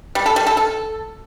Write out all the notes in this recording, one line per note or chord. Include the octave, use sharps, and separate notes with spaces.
G3
A4
G3
A4
A4